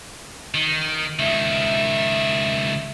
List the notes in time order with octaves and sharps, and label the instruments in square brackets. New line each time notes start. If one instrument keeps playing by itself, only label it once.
[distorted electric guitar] D#3
[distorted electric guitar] C#2 D#3 [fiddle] E5